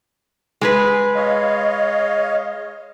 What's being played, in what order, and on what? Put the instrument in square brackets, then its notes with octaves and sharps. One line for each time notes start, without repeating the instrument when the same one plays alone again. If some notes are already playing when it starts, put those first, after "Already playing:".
[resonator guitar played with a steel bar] G#3 G#4 B4
[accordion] C#5 D#5 F5